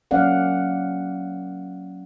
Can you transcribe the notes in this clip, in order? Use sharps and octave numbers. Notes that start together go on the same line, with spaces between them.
F#3 A#3 C#4 D5 F5 F#5